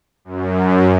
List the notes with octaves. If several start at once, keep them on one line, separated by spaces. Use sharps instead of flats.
F#2